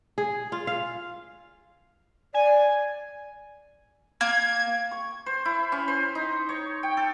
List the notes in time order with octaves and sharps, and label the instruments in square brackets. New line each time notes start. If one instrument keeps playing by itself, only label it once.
[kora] G#4
F4
F5
[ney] D5 [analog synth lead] G#5
[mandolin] A#3 [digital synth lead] G#6
[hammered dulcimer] C#6
C5
E4
C#4
C5
D#4
C#5
G5
A4